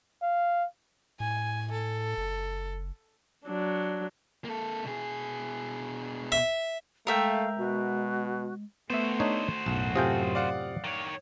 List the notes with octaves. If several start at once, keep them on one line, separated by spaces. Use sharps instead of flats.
F5
A2 G#5
A4
F#1
F#3 D4
A#3 A4
B2 G#4
E5
G#3 A3 A#4 E5 F5 G5
B2 F#4
A3 B3 F#4 C5 E5
D4 D#4 C#5
B1 F#2 A2 E7
C3 F4 A4 G5 G#5 D#6
D5 F5 F#5
D#3 C#5